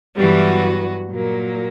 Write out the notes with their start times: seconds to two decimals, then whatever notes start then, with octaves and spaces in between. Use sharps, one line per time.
0.16 G2 E3 F#3 G3 B3 F#4
1.10 A#2 F#3 A#3